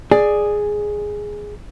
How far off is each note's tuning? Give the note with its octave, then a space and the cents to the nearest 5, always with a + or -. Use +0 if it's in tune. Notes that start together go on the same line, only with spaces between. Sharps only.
G#4 +0 D5 +15